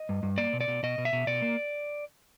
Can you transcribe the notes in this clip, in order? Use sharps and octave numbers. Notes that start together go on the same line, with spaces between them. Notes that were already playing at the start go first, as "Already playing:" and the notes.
Already playing: D#5
G2
G2
A#3 D5
B2
D5
B2
B2 D#5
B2
E5
B2
B2 D5
A#3